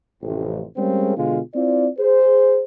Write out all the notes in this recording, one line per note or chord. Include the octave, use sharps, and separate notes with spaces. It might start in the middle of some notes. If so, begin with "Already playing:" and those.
A1 F2 C3
G3 G#3 A#3 C4 C#4 G#4
B2 D3 G#3 F4
C4 E4 F4 D5
G#4 C5